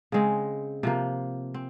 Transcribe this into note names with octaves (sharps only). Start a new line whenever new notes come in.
C#3 G#3 C4
C3 F3 A#3
C4